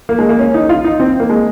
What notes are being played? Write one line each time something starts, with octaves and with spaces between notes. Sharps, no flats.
A#3
G#3
A#3
C#4
D#4
F4
D#4
C4
A#3
G#3